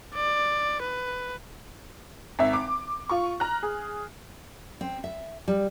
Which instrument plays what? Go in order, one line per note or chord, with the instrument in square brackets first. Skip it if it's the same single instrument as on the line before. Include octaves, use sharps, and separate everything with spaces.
[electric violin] D5
B4
[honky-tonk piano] G#1 E5
D6
F4 C#6
A#5 F6 F#6
G#4
[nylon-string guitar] C4
E5
G3